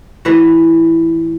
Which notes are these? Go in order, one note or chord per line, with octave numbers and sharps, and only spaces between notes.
A2 E3 F#4 B4